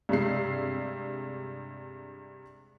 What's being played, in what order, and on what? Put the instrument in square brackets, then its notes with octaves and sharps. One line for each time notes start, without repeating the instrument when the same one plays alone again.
[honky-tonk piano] G2 C3 G#3 C7